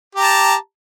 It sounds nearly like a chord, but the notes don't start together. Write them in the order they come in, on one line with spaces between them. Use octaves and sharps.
G4 A#5 A5